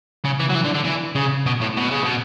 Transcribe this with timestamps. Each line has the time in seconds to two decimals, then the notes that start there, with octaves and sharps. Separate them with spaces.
0.24 C#3
0.40 E3
0.50 F#3
0.55 E3
0.65 D3
0.75 D3
0.85 E3
1.15 C#3
1.46 B2
1.61 A2
1.77 B2
1.91 C#3
2.04 B2